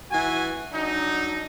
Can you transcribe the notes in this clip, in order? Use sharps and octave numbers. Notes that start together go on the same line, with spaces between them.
E3 F#4 G#5
F#3 D4 D#4